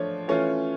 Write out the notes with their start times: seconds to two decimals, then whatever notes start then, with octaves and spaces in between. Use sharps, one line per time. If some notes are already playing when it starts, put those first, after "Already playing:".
Already playing: F3 A3 D4 F4 C#5
0.28 E3 A3 C#4 F4 C#5